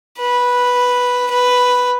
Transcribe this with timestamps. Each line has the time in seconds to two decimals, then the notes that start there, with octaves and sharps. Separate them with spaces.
0.20 B4
1.31 B4